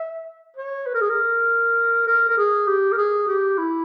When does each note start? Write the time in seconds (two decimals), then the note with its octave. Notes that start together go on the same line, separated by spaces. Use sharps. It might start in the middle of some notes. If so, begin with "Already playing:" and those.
Already playing: E5
0.56 C#5
0.86 B4
0.95 A#4
1.01 G#4
1.10 A#4
2.07 A#4
2.29 A#4
2.38 G#4
2.67 G4
2.92 A#4
2.97 G#4
3.28 G4
3.58 E4